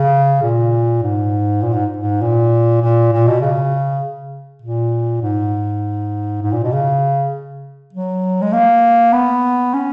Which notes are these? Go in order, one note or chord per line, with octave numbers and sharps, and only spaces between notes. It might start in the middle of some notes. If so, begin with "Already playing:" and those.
Already playing: C#3
A#2
G#2
A#2
G#2
G#2
A#2
A#2
A#2
B2
C#3
A#2
G#2
G#2
A#2
B2
C#3
F#3
G#3
A#3
B3
C#4